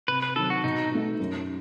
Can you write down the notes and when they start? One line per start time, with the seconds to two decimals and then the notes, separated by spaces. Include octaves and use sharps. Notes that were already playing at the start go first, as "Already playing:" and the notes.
0.08 C3 B4
0.22 B4
0.36 D#3 F#3 C4 A4
0.50 F#4
0.64 B2 D#4
0.92 A3 D#4
1.19 F#2